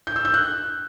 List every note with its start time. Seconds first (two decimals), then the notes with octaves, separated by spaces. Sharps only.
0.07 G6
0.16 E6
0.25 G6
0.34 F#6